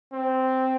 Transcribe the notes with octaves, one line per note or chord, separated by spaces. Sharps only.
C4